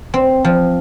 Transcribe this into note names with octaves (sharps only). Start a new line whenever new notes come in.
C4
F3